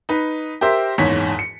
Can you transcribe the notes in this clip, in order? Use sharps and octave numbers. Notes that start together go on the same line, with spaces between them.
D#4 B4
G4 A#4 C5 E5
F#1 E2 G#2 C#5 B6
C#7